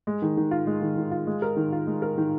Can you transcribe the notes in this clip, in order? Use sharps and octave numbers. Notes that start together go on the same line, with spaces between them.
G#3
D#3
D#3
F4
G#3
D#3
D#3
F4
G#3
A#4
D#3
F4
G#3
A#4
D#3